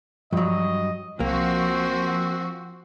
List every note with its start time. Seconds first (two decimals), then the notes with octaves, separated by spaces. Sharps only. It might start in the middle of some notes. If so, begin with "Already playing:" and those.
0.33 G2 F3 F#3 D#5
1.20 C2 F3 A#3 C4 F#4